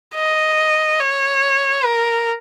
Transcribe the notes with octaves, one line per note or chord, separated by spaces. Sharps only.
D#5
C#5
A#4